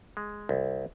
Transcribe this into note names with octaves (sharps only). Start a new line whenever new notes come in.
G#3
C2